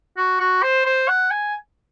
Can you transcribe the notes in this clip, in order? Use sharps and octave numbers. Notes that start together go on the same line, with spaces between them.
F#4
F#4
C5
C5
F#5
G#5